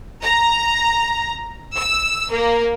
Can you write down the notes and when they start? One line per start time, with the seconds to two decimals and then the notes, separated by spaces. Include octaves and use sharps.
0.24 A#5
1.77 E6
2.31 A#3